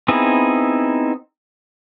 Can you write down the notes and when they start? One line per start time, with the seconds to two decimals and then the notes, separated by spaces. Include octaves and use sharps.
0.08 B3 C4 D#4 E4 G#4